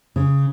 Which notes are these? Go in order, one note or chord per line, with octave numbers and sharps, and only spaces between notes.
C#3